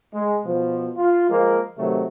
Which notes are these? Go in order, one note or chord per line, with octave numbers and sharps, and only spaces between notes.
G#3
B2 F3
F4
F3 G#3 A#3
C3 D#3 F#3 A3